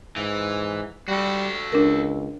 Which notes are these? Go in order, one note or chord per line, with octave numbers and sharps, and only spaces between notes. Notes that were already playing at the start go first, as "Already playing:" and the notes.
G#2 E3
G3 F#4 A4
C#2 D4 A#4